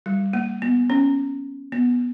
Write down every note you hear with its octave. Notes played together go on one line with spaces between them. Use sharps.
G3
A#3
B3
C#4
B3